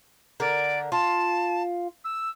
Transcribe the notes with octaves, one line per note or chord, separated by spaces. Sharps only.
D3 A#4 D5
F4 A5
E6